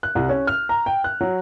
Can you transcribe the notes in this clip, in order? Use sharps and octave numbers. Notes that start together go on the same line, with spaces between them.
F#6
C2
C#4
F6
A#5
G5
F#6
F#3